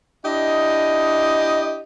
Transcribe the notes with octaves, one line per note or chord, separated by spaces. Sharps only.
D4 E4 G4 D#5